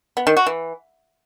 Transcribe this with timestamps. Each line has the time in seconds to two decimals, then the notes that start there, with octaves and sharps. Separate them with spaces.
0.17 B3
0.27 D#3
0.37 F#4
0.46 E3